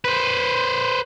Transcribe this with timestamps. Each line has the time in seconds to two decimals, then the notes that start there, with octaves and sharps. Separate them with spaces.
0.04 B4 C5